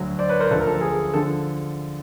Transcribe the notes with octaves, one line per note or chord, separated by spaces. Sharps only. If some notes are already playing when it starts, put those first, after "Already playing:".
Already playing: D2 D3 F#3
C5 D5
B4 C#5
A#4 C5
D2 D3 F3 A4 B4
A#4
A4
G#4
D3 F3 A4